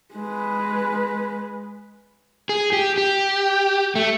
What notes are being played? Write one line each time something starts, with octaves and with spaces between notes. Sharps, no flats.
G#3 B4
G#4
G4
G4
A3